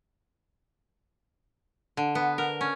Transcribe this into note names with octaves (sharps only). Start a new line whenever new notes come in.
D3
B3
A#4
C#4